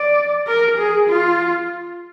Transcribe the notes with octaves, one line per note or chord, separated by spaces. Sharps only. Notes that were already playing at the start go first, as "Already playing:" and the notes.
Already playing: D5
A#4
G#4
F4